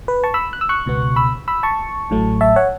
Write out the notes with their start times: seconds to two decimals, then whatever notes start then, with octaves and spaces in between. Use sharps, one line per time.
0.08 B4
0.24 A5 C#6
0.34 B5 E6
0.53 F#6
0.61 E6
0.69 C#6 F#6
0.86 C#2 B2 B3
1.16 B5 E6
1.48 B5 E6
1.63 A5 C#6
2.10 A1 A2 F#3 A3
2.41 E5 A5
2.56 C#5 F#5